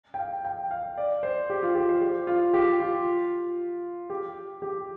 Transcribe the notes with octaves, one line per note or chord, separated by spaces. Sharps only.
G5
F5
G5
F5
D5
C5
G4
F4
G4
C5
G4
F4
G4
F4
G4
G4